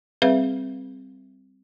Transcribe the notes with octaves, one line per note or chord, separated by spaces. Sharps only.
G3 C4 G#4 B4 E5 F5